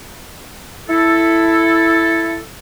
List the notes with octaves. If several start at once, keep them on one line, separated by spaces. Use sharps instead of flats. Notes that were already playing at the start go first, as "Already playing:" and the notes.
E4 A4